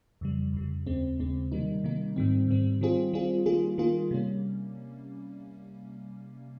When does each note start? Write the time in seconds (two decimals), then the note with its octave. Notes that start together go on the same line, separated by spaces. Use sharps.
0.21 F2 C#3 G3
0.54 F2 C#3 G3
0.86 D#2 C#3 G#3 C4
1.20 D#2 C#3 G#3 C4
1.52 C3 D#3 G3 A#3 D#4
1.84 C3 D#3 G3 A#3 D#4
2.16 G#2 D#3 G3 C4
2.48 G#2 D#3 G3 C4
2.81 D#3 G3 C4 F4 G#4
3.13 D#3 G3 C4 F4 G#4
3.46 D#3 G3 A#3 F4 G#4
3.78 D#3 G3 A#3 F4 G#4
4.11 C3 G3 A#3 C#4